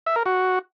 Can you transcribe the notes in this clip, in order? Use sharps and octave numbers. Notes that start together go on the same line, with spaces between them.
E5
A#4
F#4